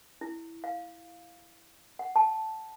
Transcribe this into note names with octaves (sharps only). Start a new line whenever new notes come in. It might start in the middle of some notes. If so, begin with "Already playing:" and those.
E4
F5
F#5
A5